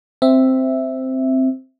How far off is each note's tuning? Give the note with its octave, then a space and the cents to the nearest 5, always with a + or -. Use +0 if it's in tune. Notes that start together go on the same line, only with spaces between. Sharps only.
C4 +0 E5 +0